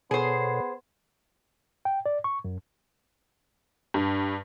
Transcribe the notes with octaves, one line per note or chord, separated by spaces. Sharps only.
B2 B3 G#4 A4 C5 C#5
G5
D5
C#6
F#2
G2